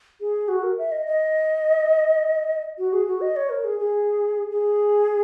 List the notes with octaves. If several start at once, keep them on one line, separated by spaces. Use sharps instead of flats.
G#4
F#4
A#4
E5
D#5
D#5
F#4
G#4
F#4
D#5
C#5
A#4
G#4
G#4
G#4